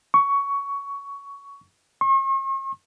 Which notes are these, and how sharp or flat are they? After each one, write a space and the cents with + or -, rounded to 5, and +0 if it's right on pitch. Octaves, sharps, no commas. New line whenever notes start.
C#6 +15
C#6 -45